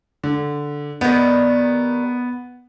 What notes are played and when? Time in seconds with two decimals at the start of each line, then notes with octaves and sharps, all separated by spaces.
0.24 D3
1.01 D#3 G3 B3